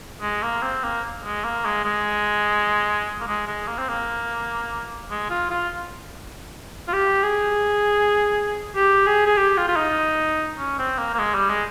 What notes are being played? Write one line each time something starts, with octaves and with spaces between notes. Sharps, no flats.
G#3
A#3
C4
A#3
G#3
A#3
G#3
G#3
A#3
G#3
G#3
A#3
C4
A#3
G#3
F4
F4
F4
G4
G#4
G4
G#4
G#4
G4
F4
F4
D#4
C#4
C4
A#3
A#3
G#3
G3
G#3